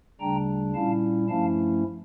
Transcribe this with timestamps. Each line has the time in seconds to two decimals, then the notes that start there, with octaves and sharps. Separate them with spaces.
0.20 D2 C#3 G3 D4 G5 A#5
0.75 A#2 G3 C#4 E4 F5 A5
1.29 G2 F3 A3 C#4 E4 F5 A5